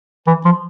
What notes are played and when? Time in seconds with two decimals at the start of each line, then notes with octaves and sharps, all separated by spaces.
0.27 E3
0.45 F3